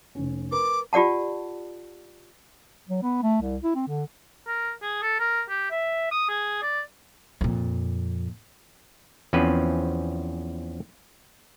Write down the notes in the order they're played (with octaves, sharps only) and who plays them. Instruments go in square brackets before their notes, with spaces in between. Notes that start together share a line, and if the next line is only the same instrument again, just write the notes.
[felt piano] F1 C#4
[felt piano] A#4 B4 [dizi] D6
[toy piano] F4 G4 D5 F#5 A5
[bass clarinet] F#3
B3
A3
C2
E4
C4
D3
[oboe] A#4
G#4
A4
A#4
G4
E5
D#6
G#4
D5
[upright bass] F2 A#2
[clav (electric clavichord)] E2 F3 C4 C#4 B4